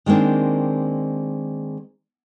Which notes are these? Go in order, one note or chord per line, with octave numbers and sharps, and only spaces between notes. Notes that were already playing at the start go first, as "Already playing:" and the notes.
D#3 G#3 A#3 C4 D4